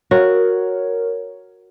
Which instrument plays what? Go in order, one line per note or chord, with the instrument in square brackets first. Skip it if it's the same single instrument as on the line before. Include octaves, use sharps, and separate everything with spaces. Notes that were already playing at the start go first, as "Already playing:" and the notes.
[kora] F#4 [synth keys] A#4 C#5